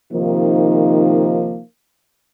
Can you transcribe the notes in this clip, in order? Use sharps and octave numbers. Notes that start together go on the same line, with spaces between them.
C3 D#3 F3 A#3 D#4